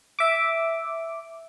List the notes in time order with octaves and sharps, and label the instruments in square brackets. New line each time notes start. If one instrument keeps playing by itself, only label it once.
[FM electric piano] E5 D6